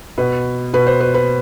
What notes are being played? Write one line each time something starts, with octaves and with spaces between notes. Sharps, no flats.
B2 B4
B2 B4
C5
B4
B4